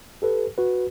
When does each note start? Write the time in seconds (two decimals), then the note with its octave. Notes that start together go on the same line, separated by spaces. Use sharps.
0.22 G4 A4 B4
0.58 F#4 B4